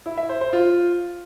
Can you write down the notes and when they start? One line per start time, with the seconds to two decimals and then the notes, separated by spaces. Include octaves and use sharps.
0.06 E4
0.18 E5
0.29 C5
0.41 C5
0.53 F4